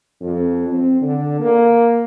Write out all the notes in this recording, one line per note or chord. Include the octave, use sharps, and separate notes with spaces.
F2
C4
D3
A#3